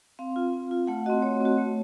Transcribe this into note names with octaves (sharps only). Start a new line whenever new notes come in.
C4 F5
F4
C4
F4
A3 F#5
C4 F#4 D#5
A3 C#5
C4 F#4
A3